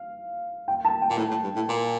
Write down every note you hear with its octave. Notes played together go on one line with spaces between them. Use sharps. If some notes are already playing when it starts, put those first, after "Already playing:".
Already playing: F5
G5
A5
G5
A#2
A2
A2
G2
A2
A#2